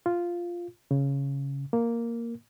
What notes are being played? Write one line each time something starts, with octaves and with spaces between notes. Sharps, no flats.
F4
C#3
A#3